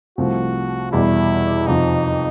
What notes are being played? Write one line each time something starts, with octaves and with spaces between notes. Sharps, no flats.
C2 C3 F3 A3 F#4
E2 B2 G3 E4
F2 C3 F3 D#4